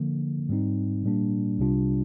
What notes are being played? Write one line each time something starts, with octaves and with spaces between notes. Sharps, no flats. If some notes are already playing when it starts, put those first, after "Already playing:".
Already playing: D3 F3 A#3
G#2 G3 C4 D#4
A#2 G3 A#3 D4
C2 C3 G3 D4 F4